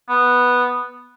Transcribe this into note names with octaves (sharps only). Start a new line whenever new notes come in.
B3